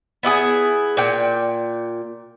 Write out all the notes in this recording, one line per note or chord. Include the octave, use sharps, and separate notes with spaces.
B3 E4 G4 G#4
A#2 G5